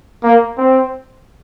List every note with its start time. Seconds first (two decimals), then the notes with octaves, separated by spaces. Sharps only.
0.24 A#3
0.58 C4